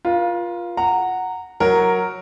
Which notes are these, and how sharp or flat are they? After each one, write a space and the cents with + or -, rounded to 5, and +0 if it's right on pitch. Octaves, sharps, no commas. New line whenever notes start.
F4 +0 A#4 +45
F#5 +0 A#5 -15
F#3 +0 F#4 +0 A#4 +0